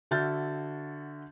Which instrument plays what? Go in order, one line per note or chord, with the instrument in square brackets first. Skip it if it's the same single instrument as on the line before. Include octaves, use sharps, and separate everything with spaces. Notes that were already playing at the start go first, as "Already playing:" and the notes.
[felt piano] D3 F#4 E5 F6 G6 A6